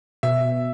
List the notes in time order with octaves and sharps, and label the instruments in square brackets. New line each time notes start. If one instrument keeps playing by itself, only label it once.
[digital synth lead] B2 [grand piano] E5